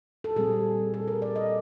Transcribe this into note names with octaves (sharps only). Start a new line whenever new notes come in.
A4
A#2 G3 C4 G#4
A4
A#4
D5
D#5